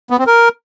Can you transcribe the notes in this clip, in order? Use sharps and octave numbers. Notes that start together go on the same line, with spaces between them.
B3
C4
A#4